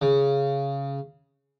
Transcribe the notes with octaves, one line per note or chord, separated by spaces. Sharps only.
C#3